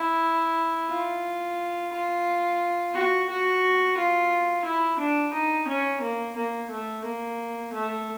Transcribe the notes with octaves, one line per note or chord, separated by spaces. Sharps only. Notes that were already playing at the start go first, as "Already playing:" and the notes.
Already playing: E4
F4
F4
F#4
F#4
F4
E4
D4
D#4
C#4
A#3
A#3
A3
A#3
A3